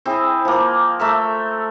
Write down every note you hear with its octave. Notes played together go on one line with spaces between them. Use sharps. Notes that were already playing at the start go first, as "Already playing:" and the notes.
C4 E4 G#4
F3 A#3
A3 A#4 E5